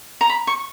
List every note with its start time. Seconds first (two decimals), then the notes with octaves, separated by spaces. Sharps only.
0.21 A#5
0.29 B5
0.47 C#6